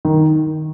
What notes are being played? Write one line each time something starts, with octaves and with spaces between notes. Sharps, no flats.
D#3